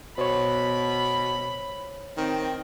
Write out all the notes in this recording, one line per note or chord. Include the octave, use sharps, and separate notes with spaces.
B2 C5 C#5 B5
D#3 C4